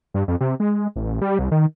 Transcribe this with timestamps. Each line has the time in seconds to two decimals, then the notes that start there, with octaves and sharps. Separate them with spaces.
0.14 G2
0.28 F2
0.41 C3
0.60 G#3
0.96 A1
1.21 G3
1.39 C2
1.51 D#3